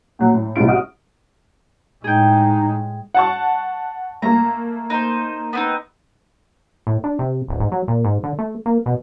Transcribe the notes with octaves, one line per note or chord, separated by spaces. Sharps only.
A#2 F#3
A2
C2 A2 G#3 C4 F4 D7
F#4 D#5 D#6 F6
A2 G#3 D#4 G#4 G5
F#5 A5 C#6
A3 A#3 A#5
D#4 C5
B3 C4 D#4
A2
D4
C3
D1
G#2
F#3
A#2
G#2
D3
A3
A#3
B2